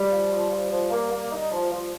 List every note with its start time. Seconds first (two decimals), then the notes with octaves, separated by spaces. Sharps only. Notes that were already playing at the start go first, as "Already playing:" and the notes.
Already playing: G3
0.11 F3
0.30 F3
0.50 F3
0.70 F3
0.91 A#3
1.11 A#3
1.32 D#4
1.51 F3
1.72 F3